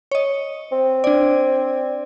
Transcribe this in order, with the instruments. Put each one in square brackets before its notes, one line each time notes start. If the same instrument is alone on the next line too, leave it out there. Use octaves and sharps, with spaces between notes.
[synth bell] C#5 D#5
[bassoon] C4
[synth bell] D4 D5